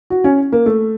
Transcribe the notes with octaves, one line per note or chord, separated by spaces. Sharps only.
F#4
C#4
A#3
A3